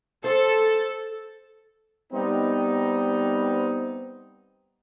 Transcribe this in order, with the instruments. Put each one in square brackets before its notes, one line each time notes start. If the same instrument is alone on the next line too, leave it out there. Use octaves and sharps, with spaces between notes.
[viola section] A4 [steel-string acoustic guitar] C5
[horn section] G3 B3 C4 D#4